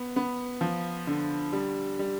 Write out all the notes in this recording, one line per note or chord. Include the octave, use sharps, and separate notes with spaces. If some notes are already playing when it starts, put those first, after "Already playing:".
Already playing: B3
B3
F3
D3
G3
G3